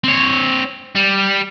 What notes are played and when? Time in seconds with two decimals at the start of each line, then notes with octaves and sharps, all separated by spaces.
0.04 C4 C#5
0.95 G3